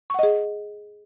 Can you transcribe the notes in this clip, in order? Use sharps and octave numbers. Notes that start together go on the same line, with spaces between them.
G#4 D#5 F#5 C#6